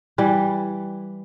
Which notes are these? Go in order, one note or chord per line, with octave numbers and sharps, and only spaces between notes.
E3 G3